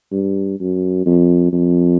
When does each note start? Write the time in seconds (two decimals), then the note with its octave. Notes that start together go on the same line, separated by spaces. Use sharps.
0.12 G2
0.60 F#2
1.06 F2
1.53 F2